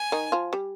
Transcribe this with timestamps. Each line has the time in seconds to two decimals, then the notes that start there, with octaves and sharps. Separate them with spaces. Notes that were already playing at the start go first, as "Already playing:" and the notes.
Already playing: G#5
0.12 D#3 D#4
0.32 F3 F4
0.53 G3 G4